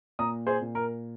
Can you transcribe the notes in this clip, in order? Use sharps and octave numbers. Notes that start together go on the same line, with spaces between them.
A#2 A#5 D#6
G#4 C5
A#2
A#4